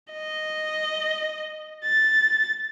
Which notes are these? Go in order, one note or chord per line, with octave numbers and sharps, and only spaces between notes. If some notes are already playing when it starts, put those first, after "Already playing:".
D#5
A6